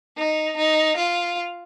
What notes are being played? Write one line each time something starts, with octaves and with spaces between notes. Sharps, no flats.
D#4
D#4
F4